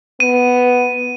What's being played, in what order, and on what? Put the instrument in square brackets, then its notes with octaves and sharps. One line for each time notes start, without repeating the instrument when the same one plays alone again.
[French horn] B3 [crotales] D#7